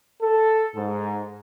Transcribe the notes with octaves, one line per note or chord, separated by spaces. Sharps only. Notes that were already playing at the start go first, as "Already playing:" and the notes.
A4
G#2